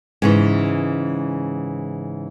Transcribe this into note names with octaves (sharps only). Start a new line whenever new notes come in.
G#2 C#3 E3